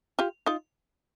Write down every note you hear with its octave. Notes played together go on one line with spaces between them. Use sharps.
F4 G4
D#4 F4